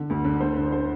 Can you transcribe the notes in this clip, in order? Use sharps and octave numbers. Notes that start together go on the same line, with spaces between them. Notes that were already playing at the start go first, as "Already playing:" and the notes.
Already playing: D3
D2
D3
D2 C5
D3
C5